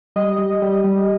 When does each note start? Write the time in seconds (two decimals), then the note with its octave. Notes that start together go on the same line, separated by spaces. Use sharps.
0.16 G3 D#5
0.38 G3
0.62 G3
0.84 G3